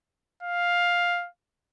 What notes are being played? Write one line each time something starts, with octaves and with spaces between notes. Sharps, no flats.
F5